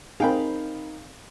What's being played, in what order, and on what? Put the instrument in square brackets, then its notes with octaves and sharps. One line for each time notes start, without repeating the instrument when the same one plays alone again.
[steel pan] C4 G#4 [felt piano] D#4 A#4 [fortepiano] F5 G5 B5